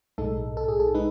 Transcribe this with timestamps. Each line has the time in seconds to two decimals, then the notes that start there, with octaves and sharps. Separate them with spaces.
0.18 B1 A2 G#3 D#4 A4
0.57 A4
0.68 G#4
0.80 A4
0.94 G#3 D#4 B4